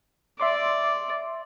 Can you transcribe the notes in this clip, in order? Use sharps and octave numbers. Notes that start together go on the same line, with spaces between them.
D5 E5 C6 D6